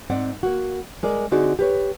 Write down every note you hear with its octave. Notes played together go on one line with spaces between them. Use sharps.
G#2 C4 D5 F#5
A#3 F#4
G#3 A#4 D5
D3 C4 D#4 F#4 G#4 D5
G4 B4 C#5